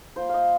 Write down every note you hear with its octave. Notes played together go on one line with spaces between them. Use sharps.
A#3 F4 C5
D#5 F5